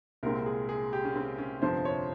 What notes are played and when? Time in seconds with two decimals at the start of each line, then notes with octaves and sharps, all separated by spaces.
0.23 C2 A#2 G#3 C4 A#4
0.46 G#4
0.69 G#4
0.93 G4
1.04 C#4
1.15 C4
1.38 C#4
1.62 G1 F2 C3 F3 C5
1.85 C#5